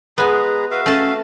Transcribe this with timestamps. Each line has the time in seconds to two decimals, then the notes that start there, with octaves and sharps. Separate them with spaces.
0.18 G#3 B3 G#4 B4 G#5 A#5
0.71 F#4 B4 E5 F5
0.86 A3 C#4 A5